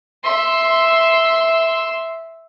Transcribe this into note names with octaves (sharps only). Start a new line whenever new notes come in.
E5 C6